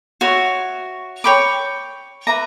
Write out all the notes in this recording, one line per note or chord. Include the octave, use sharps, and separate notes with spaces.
F#4 C#5 E5
C#5 G5 B5 D6
B4 E5 A#5 D6